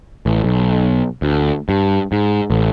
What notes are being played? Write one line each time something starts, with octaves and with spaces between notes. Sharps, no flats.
A1
B1
D2
G2
G#2
A1